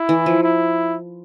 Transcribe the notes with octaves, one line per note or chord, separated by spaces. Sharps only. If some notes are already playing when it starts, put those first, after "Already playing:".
Already playing: E4
E3
F3
E4